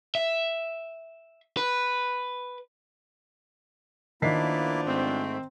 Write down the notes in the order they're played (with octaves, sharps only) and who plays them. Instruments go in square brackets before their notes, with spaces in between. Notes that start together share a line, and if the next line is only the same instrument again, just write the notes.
[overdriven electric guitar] E5
B4
[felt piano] D#3 B6 C7 [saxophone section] F3 B3 D4 [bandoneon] A#3 E4
[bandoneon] G#2 A3 [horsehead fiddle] C4